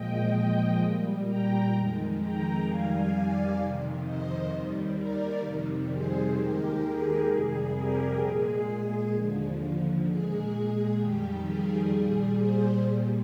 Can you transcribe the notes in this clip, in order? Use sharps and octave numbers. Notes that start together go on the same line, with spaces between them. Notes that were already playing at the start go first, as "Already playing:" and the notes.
Already playing: A#2 F3 G#3 D#5 G5
A#2 G3
G5 A#5
F2 D#3 G#3
G5 A#5
F2 D#3 G3 F5 G#5
D5 F5
F2 C3 D#3
C5 D#5
D#2 D#3 G3
A#4 D5
F2 C3 D#3 G3
G#4 C5
D#2 D#3 G#3 G4 A#4
G#4
F2 C3 G3 G#4
G4 A#4
A#2 G#3 G#4
G#4
D#2 D3 F3
A#2 G#3 G#4
F2 D#3 G3 G4
G#4
A#2 G3 G#4
G#4 C5
A#2 G3